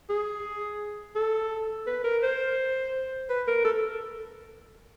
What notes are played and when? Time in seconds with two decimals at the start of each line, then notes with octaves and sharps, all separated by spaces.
0.10 G#4
1.16 A4
1.87 B4
2.04 A#4
2.23 C5
3.29 B4
3.47 A#4
3.65 A4